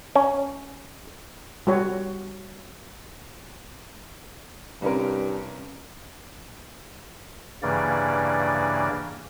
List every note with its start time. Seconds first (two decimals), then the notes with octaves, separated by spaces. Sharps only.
0.15 C#4
1.67 G3 F#4 C#5
4.82 C2 G2 C#4 A#4
7.63 G2 C#3 E3 A#3 D5